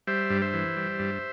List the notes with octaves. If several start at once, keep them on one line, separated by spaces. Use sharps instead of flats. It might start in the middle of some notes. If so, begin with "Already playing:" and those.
G3 C5 E5
G2
C5 E5
E3
G3
G2